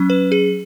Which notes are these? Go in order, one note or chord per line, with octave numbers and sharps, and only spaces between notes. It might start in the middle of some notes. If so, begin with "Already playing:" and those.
Already playing: F#3 C#4
B4
G#4